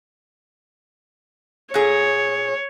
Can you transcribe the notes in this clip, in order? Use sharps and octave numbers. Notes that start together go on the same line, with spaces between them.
A#2 G#4 C#5